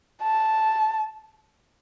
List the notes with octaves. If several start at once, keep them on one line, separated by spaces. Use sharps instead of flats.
A5